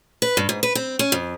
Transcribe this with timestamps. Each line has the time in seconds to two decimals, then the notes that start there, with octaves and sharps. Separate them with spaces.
0.22 B4
0.37 G2
0.49 G#2
0.63 B4
0.75 C4
0.99 C#4
1.12 F2